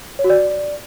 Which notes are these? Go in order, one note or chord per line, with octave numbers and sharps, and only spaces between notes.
C#5
F#4
D5